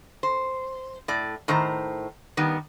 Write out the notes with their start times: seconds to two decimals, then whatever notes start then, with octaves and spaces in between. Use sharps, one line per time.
0.23 C5
1.08 A2 D5
1.48 A2 D#3 C5 A#5
2.37 D#3 G3 B3